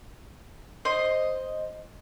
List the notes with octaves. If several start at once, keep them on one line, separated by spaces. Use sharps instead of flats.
C5 D#5